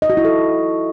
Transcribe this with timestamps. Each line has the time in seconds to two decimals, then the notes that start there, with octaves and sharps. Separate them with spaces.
0.02 D#5
0.10 F#4
0.17 E4
0.25 A4